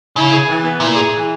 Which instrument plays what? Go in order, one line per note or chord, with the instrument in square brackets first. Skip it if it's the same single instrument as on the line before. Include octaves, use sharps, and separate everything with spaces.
[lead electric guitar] C#3 [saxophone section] E4
[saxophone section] G#4
E3
B3
[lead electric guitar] A#2 [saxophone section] E4
[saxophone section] G#4
E3